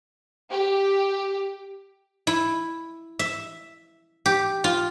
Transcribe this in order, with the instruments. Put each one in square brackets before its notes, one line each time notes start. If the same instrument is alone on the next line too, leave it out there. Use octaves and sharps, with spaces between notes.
[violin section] G4
[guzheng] E4
E5
G4
F4